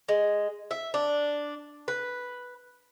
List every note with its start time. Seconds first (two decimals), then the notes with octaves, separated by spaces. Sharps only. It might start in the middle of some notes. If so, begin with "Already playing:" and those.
0.09 G#3
0.71 E5
0.94 D4
1.88 B4